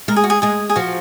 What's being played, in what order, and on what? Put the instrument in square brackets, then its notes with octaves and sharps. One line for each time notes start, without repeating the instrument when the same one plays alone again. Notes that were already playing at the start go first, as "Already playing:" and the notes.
[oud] G#3 [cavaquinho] A#4
[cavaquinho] G#4
F#4
G#4
[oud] G#3 [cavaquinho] G#4
[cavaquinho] G#4
[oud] F3 [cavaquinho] F#4